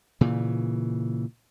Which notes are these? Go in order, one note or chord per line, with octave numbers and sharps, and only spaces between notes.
A#2 C#3 E3